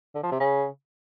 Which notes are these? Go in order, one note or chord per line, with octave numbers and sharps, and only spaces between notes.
D3
F3
C3
C#3